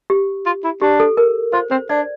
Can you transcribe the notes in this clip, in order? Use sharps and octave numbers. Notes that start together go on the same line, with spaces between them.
G4
F4
E4
D4 G4
A4
A#4
F4 C5
C4 C5
D4 D5